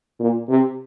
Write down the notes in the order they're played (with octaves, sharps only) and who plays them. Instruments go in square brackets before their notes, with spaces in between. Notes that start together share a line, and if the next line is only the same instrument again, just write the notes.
[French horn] A#2
C3